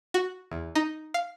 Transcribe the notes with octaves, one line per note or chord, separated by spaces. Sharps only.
F#4
E2
D#4
F5